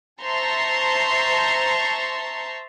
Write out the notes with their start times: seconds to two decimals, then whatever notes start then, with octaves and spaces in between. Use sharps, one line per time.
0.22 C5 E5 A5 A#5 C6 C#6